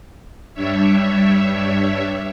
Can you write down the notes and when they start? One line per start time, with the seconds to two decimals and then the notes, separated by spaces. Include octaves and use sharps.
0.54 G2 G3 D4 C#5 E5